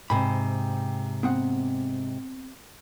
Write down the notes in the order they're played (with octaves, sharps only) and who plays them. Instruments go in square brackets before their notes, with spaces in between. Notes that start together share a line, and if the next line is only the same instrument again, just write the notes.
[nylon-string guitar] G#2 C3 [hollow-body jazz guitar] B5
[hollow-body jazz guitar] B3 C4 F#5